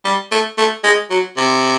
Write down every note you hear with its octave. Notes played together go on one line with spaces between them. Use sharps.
G3
A3
A3
G#3
F#3
C3